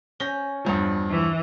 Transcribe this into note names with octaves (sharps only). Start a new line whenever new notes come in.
C#4 G6 A#6 G7
E2 G2 F3
E3